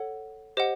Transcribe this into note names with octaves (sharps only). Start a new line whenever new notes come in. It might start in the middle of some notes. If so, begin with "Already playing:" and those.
Already playing: A4 C#5 F#5
G4 C5 D#5 F#5